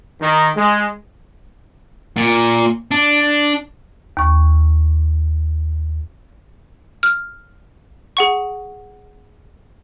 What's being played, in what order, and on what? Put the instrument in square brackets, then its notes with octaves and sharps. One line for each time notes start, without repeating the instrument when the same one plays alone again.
[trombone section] D#3
G#3
[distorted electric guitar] A#2
D4
[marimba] D#2 C#6
[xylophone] F6
G#4 F#5 C#6